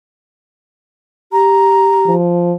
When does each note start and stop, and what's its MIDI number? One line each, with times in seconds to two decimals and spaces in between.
1.32 2.16 67
1.32 2.13 82
2.07 2.54 53